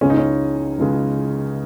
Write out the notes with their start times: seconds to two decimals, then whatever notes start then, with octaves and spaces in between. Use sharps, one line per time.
0.01 C#2 C#3 G#3 C#4
0.10 D#4
0.17 C#4
0.78 C#2 C#3 G#3